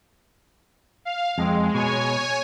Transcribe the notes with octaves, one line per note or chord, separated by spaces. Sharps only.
F5
F2 G#3 C4
B2 G#3 C#5 G#5